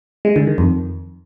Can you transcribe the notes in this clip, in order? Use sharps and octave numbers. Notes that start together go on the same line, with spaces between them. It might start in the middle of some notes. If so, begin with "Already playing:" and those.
G#3
D3
D#3
F2